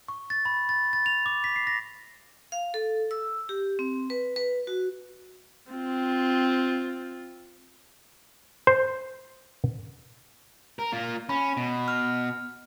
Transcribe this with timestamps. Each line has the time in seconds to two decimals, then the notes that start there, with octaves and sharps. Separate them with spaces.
0.08 C#6
0.30 A6
0.45 B5
0.69 A6
0.93 A6
1.06 F7
1.26 D6
1.44 B6
1.56 C7
1.67 A#6
2.52 F5
2.74 A4
3.11 E6
3.49 G4
3.79 C4
4.10 B4
4.36 B4
4.67 F#4
5.71 C4 F4
8.67 C5
10.79 A#4
10.92 A#3 F4
11.29 C#4 B5
11.57 B2
11.88 F6